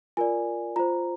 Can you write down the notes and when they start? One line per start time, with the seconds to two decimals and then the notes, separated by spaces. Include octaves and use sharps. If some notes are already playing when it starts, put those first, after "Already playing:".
0.17 F4 A#4 D5 G#5
0.76 F4 C5 A#5